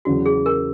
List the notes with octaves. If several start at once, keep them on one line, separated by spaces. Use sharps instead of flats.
E2 C#3 F#3 F#4
G#4
A#4